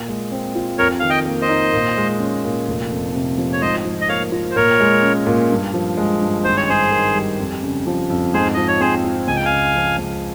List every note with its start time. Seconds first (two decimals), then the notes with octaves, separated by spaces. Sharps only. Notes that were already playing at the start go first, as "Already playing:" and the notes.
Already playing: A#2
0.08 G#3
0.32 C4
0.55 F4
0.78 F2 A#4 C#5
1.00 D#3 F5
1.10 D#5 G5
1.25 A#3
1.42 C5 D#5
1.49 D#4
1.73 A#2
1.97 G#3
2.20 C#4
2.44 A#2
2.67 F1
2.91 F2
3.14 C3
3.38 F3
3.53 C#5
3.61 G#2 C5 D#5
3.85 F3
4.01 D#5
4.09 A#3 C#5 F5
4.32 F4
4.51 C5
4.56 A#2 A#4 C#5
4.80 G#3
5.03 C#4
5.27 A#2
5.51 G2
5.74 F3
5.97 G#3
6.22 G2
6.44 G#1 C5
6.57 C#5
6.69 G2 G#4 C5
6.92 D#3
7.15 G3
7.39 F2
7.63 C#3
7.87 F3
8.10 F2
8.34 G#2 G#4 C5
8.54 F3 D#5
8.68 C#5
8.80 C4 G#4 C5
9.04 F4
9.27 C#2 G#5
9.36 G5
9.45 F5 G#5
9.50 C#3
9.75 F3
9.98 C#2